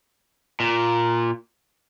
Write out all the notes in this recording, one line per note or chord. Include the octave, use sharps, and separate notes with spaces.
A#2